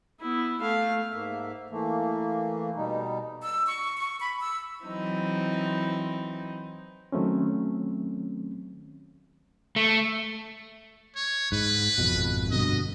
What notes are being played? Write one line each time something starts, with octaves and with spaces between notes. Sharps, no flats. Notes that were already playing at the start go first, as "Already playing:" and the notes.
B3 E4
A3 F5
G#2 A#3 E5
E3 A3 A#3
B2 G3 D#4
E6
C#6
C#6
B5
E6
E3 F#3 C4 D#4 E4
D#3 F#3 A3 C4 C#4
A3
C#5
G#2 B4
G#1 F2 B2
G2 B2 D3 D#5